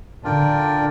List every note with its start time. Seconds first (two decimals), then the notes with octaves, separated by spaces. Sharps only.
0.24 D3 D4 F4 A#4 D5 G5